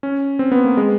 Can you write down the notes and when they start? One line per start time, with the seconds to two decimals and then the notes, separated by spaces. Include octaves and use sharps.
0.03 C#4
0.39 C4
0.52 B3
0.65 A#3
0.77 G#3